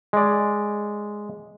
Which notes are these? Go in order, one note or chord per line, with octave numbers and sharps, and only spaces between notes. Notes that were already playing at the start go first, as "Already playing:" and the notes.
G#3 D5